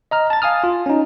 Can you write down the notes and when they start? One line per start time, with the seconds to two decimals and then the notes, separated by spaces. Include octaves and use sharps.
0.11 D#5 A#5 F6
0.30 A5 A6
0.42 F5 G#5 D#6 F6
0.64 F4
0.86 C#4 D#4